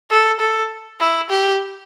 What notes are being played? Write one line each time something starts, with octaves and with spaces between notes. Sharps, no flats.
A4
A4
E4
G4